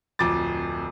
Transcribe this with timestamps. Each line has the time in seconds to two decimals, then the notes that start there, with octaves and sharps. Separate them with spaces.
0.19 D1 F2 D6 A6